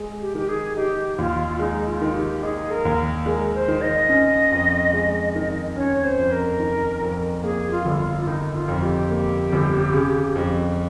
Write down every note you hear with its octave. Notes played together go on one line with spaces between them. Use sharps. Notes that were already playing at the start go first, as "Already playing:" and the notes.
Already playing: G#3
G4
D#3 G4
G#4
D#4 G4
D#2 F4
G#3 D#4
F4
D#3
G4
D#4 G#4
A#4
D#2
G#3 A#4
C5
D#3
D#5
C#4
F2
G#3
D#3
C#4 C#5
C5
F2
A#4
D#3
F2
A#3 G#4
F4
G1
F4
F4
D#3 D#4
F4
F2
G4
A#3
G1
C#3
F2